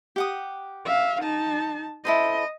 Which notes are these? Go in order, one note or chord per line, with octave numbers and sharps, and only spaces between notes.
G4 F#5 D#6
E5 F5
D#4 A5
E4 A4 C5 D#5